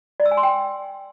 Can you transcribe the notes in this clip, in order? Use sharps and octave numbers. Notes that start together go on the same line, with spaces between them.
D5
E6
G#5
C6
G5